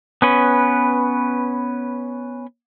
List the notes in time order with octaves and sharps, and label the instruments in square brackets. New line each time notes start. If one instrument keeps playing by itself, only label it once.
[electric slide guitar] B3 C#4 B4